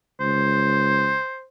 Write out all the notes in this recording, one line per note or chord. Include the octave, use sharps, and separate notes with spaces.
C#2 C5